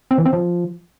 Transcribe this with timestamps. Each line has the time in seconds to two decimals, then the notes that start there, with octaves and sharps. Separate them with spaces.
0.11 C4
0.18 E3
0.25 C4
0.33 F3